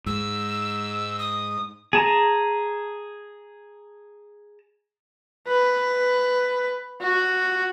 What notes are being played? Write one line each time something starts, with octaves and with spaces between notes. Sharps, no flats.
G#2 E6
D#6
G#4 A5 A#5
B4
F#4